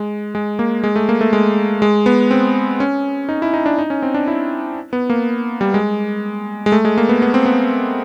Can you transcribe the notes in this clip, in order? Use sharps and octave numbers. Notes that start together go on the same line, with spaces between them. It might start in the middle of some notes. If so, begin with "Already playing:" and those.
Already playing: G#3
G#3
A#3
G#3
A3
A#3
A3
G#3
G#3
B3
C4
C#4
D#4
E4
D#4
D4
D#4
C#4
C4
D4
E4
B3
A#3
G3
G#3
G#3
A3
G#3
A#3
B3
B3
C4
B3